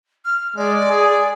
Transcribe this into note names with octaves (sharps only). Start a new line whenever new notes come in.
F6
G#3 D5
G#4